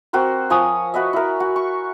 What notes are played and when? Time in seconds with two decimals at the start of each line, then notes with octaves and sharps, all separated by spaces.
0.13 C4 F#4 A#4 C5
0.50 F3 C#5 G#5 D#6
0.94 F#4 B4 D#5 E5
1.13 E4 A#4
1.40 F#4
1.56 C#6